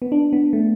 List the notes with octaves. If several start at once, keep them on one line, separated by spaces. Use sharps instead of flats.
B3
D4
B3
A3